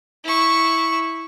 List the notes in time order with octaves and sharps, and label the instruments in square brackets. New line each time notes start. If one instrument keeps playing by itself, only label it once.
[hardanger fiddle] E4 C#6